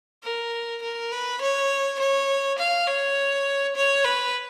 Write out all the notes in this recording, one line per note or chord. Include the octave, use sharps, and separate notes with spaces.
A#4
A#4
B4
C#5
C#5
F5
C#5
C#5
B4